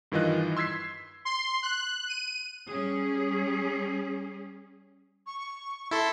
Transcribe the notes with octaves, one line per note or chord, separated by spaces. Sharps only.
G2 D#3 E3 F4 D#5 F#6
C6 E6 G#6 B6 C7
C6
F#6
D#7
G3 C#4 G#4
C#6
E4 A4 C6